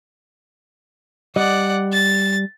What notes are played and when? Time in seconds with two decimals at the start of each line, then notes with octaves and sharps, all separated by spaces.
1.36 G3 D5 D#5 F#5
1.93 A6